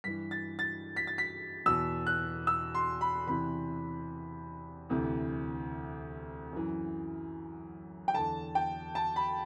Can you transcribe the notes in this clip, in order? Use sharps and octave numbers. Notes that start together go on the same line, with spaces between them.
G2 E3 B6
A6
A6
B6
A6
B6
E2 B2 E6
F#6
E6
C6
B5
E2 C3 E3 B5
D2 C3 E3
F#2 E3
G5
E2 D3 A5
G5
A5
B5